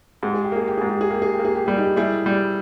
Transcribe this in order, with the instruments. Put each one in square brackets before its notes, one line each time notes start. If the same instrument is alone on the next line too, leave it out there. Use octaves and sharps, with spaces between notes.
[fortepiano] G#2 [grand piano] G4
[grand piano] G#4
G4
[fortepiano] A#3 [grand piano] G#4
[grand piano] G4
[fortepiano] G#2 [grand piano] G#4
[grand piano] G4
G#4
[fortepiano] A#3 [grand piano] G4
[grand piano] G#4
G4
[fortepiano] A#3
[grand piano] G#4
G4
[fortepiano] G3 [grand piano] G#4
[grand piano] D#4 G4
[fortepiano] G3 [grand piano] E4 G#4
[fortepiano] G3